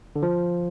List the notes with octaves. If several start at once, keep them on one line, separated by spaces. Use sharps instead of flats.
D3
F3